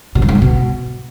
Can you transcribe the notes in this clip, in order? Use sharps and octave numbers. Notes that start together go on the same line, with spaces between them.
B2
G2
G#2
C3
B2